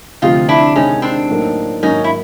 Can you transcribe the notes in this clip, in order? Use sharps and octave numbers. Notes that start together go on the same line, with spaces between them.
D2 C3 F3 D#4 F4
D4 E4
C3 D#3 G#3 C#4 D#4
C4 D4
A2 F#3 A#3 D#4
G#2 D#3 F#3 A#3 C#4 D#4
E4